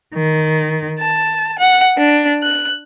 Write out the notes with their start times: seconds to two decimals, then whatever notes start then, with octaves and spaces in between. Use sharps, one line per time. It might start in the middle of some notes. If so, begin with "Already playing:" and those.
0.16 D#3
1.00 A5
1.60 F#5
1.98 D4
2.43 F#6